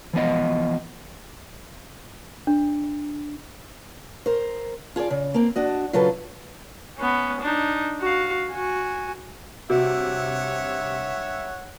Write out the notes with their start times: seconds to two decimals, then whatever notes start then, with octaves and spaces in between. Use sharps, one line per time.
0.13 E3 F3 B3 D#5
2.47 D4
4.26 A#4 C5
4.96 F4 G#4 B4 D5
5.10 C#3
5.34 A#3 C4
5.56 D4 F#4 D#5
5.93 C#3 F#3 F4 A4 B4
6.99 B3 C#4
7.41 D4 D#4
8.01 F#4 F5
8.52 F#4 G#5
9.70 G2 C3 F#4 C#5 E5 F#5